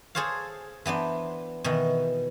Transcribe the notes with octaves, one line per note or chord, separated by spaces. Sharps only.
G#4 A4 C5 C#5 F5
E3 B3 D4 C5
B2 D#3 E3